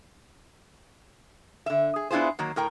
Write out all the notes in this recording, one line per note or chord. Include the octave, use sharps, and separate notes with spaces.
D3 E5
G#4
B3 D4 E4 F4 G#4 C5
D#3 F#3 A#3
A2 A#4 G5 A#5